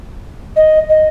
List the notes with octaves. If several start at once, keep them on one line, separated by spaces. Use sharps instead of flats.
D#5
D#5